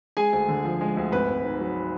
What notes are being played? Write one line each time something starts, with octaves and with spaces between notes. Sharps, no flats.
G#3 G#4 G#5
D2
D3
F3
G#3
D2
G#1 B4 B5
G#1
G#2
F#3